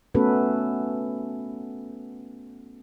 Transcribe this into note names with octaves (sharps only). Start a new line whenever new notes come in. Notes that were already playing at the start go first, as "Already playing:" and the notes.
A3 B3 C#4 F#4 A4 B4